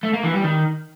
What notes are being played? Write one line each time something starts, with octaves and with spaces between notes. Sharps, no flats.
A3
A#3
E3
G3
D#3